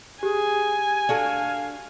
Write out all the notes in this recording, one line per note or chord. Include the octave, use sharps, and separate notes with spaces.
G4 G#4 G#5
D4 F#4 A4 F5